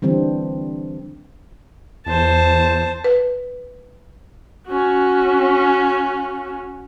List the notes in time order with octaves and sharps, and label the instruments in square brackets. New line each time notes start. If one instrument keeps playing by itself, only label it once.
[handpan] D3 E3 G3 C4 D4
[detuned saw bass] E2 [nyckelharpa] C5 A5
[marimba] B4
[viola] C#4 F#4